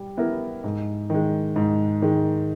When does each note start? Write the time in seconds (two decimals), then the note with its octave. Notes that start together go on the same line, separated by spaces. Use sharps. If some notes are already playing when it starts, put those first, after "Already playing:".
Already playing: G3
0.17 B3 E4 G4 A#4
0.64 G#2
1.10 D#3 G#3
1.56 G#2
2.02 D#3 G#3